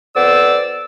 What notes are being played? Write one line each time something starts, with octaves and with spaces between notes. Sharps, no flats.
F2 B3 C5 D5 E6